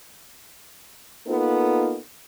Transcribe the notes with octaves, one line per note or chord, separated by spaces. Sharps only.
A#3 B3 D#4 F4 A4